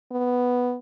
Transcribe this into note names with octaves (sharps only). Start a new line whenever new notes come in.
B3